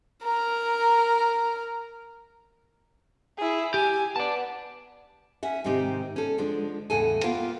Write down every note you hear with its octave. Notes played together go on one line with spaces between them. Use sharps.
A#4 A#5
E4 G#4
G4 G#5
B3 D5 A5
C#4 E5 F#5
G#2 C3 D#3 C4 D#4 G4
C#4 A4
D3 F3 G#3 D4
E2 A2 C#3 A4 F#5 G#5
A#3 B3 F4 A#4 F5 G5